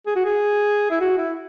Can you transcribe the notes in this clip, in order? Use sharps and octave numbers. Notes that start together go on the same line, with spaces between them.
G#4
F#4
G#4
E4
F#4
E4